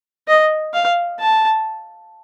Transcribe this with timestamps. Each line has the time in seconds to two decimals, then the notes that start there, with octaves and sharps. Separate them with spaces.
0.28 D#5
0.73 F5
1.19 A5